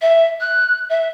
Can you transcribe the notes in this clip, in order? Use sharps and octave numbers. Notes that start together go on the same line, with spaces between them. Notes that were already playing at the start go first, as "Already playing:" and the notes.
E5
F#6
E5